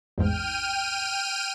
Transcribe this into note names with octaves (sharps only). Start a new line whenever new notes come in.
A1 E2 G#2 G5 F6 D#7